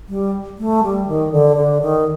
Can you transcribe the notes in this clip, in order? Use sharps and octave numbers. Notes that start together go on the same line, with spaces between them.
G3
A3
G3
D#3
D3
D3
D#3